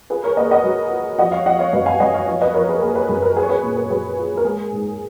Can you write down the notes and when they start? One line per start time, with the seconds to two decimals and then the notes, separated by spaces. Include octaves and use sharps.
0.10 F4 G#4 B4
0.24 A#4 C#5
0.37 A#3 B4 D#5
0.51 D#5 F#5
0.64 F#3
0.91 F4
1.18 F3 D#5 F#5
1.32 C#5 F5
1.46 F3 D#5 F#5
1.59 C#5 F5
1.73 F#2 B4 D#5
1.86 F5 G#5
2.00 F#2 D#5 F#5
2.14 C#5 F5
2.27 F3 C#5 F5
2.41 B4 D#5
2.54 F3 A#4 C#5
2.68 G#4 B4
2.82 A#3 G#4
2.95 G#4 B4
3.09 F#2 G#4
3.22 A#4
3.36 F4 G#4 B4
3.43 C#5
3.49 G#4 B4
3.63 A#2
3.77 G#4 B4
3.90 F#3 G#4 B4
4.17 F4
4.37 A#4
4.44 G#3 G#4
4.72 G#2